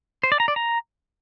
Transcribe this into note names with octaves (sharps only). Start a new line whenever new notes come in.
C5
D5
A#5
D5
A#5